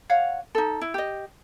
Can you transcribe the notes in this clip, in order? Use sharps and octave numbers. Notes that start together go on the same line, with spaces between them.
C#5 F5 F#5
D#4 A4
E4
G4 D#5